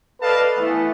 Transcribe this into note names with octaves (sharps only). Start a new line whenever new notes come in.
A4 B4 D5 D#5 F5 A5
E3 A3 B3